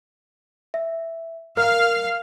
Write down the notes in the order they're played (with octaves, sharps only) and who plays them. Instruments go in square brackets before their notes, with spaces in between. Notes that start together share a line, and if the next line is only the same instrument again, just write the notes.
[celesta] E5
[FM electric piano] A#4 [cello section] F5 [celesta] F6